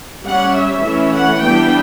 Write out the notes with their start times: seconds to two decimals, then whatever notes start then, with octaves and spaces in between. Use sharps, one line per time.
0.24 G3 C#4 F#5
0.55 E5
0.84 E3 A3 C#4
1.14 F#5
1.43 E3 G3 B3 D4 G5